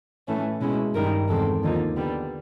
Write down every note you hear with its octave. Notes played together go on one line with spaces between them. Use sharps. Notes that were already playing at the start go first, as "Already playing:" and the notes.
A2 E3 A3 C#4
B2 G#3 C#4 E4
G2 D#3 G3 A#4
E2 C3 D#3 G#3 C4 A4
D#2 D3 F3 A#3 D#4
D3 G3 B3